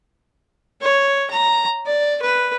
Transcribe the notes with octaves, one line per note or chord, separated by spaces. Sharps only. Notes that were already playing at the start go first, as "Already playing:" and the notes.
C#5
A#5
D5
B4